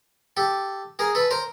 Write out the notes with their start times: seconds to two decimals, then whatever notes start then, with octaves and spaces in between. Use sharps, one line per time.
0.37 G4 A4
0.99 G#4 A#4
1.15 A4 B4
1.31 A#4 C5